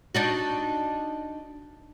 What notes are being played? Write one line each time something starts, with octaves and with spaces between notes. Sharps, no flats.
D4 D#4 F#4